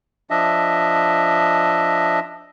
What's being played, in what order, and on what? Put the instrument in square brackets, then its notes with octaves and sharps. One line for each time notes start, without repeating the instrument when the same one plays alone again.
[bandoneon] F3 D4 D#5 E5